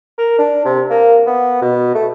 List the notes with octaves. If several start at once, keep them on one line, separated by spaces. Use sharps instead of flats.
A#4
D4
C3
A#3
B3
B2
A3